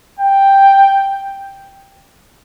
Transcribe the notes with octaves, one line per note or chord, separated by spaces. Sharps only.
G5